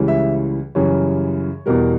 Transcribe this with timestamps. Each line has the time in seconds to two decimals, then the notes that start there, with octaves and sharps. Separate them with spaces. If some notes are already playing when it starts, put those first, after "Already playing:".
Already playing: C#2 C#3 E3 G3
0.08 E5
0.75 F#2 C#3 E3 G3 C#5
1.66 E2 B2 G3 A#4